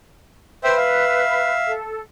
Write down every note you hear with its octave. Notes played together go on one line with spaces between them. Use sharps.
B4 C5 E5 G5
E5 F5
A4